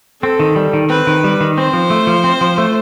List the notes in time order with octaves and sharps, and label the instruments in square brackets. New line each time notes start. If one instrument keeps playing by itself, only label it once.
[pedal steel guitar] C4 [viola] A4
[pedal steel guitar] D#3
G3
D#3
[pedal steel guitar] C4 [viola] B4
[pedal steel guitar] D#3
G3
D#3
[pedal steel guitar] C4 [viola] C5
[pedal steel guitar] F3
A3
F3
C4
F3
A3